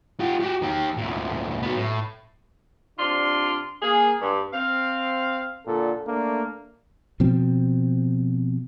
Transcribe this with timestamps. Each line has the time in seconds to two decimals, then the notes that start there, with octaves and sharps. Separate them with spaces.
0.20 F4 G4
0.41 F#4 G4
0.62 D#3 G4
0.97 D2 A#2
1.62 F#3 B3
1.76 A2
2.99 C3 D4 F4 D5 C6
3.82 A#3 G#4
4.21 G2
4.53 C4 F5
5.66 A#2 D3 A4
6.07 A3 A#3 D4
7.20 B2 F3 C4